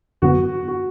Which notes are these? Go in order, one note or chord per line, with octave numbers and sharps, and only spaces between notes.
G#1 F#2 D3 F#3 B3 F#4
F#4